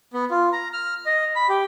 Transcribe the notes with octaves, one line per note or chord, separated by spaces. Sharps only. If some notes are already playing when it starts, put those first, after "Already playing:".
B3
F4
A#5
F6
D#5
B5
G4